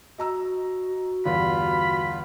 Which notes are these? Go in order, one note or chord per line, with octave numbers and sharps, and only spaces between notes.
F#4 D#5 A#5 E6
E2 G2 D3 F4 B5